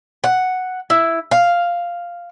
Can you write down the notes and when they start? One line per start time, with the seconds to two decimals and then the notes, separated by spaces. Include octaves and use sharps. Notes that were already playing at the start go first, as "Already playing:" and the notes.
0.24 F#5
0.90 E4
1.31 F5